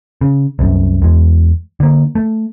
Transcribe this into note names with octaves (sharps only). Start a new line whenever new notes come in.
C#3
C2 F#2
E2 G#3
D3 A#3
A3